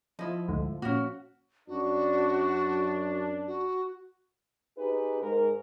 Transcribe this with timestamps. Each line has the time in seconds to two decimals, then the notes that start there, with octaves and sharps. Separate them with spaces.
0.19 F3 E4 D#5
0.48 D2 G#2
0.82 A#2 C#4 F#4
1.68 F#2 D4 F#4
3.47 F#4
4.77 D#4 G4 G#4 B4
5.22 G#2 G#3 A#4